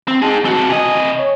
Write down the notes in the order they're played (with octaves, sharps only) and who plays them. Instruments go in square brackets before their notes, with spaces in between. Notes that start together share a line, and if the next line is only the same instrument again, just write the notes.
[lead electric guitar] C4
[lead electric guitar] D#4 G#4 [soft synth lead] A5
[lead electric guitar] C4 F#4
[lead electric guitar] C3 D#5 [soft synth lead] G#5
[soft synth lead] C#5